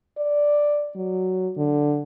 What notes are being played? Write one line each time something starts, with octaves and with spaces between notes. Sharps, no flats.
D5
F#3
D3